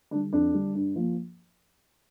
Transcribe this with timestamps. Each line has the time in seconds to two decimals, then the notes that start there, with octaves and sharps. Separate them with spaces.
0.11 D3 G3 D4
0.33 F2 D4
0.54 D3 G3
0.75 G2
0.96 F3 A#3